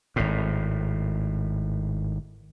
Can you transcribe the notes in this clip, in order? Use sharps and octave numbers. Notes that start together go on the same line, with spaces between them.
G#1 A2